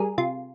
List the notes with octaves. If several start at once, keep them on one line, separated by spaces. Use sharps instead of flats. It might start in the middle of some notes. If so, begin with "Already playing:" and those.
Already playing: G3 G#4 A#4
C3 F4